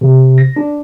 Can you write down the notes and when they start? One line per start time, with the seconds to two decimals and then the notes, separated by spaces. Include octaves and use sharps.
0.01 C3
0.38 A#6
0.56 D4